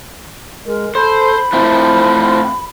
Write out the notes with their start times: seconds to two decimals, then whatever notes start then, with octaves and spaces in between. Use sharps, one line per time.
0.66 G#3 A#4
0.95 A4 C5 B5
1.53 A3 C4 E4 F4 C5